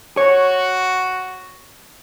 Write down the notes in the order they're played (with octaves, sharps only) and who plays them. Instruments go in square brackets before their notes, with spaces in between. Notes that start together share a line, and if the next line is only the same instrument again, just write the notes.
[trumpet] F#4 [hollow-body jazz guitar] C#5